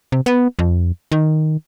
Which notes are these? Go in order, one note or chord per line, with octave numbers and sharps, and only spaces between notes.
C3
B3
F2
D#3